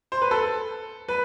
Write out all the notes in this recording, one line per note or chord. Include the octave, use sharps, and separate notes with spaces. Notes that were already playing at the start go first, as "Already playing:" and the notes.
C5
B4
A4
B4